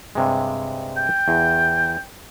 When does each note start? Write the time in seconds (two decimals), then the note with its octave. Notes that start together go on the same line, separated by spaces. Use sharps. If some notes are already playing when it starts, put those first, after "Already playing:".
0.15 G2 C3 G#3
0.97 G5
1.28 E2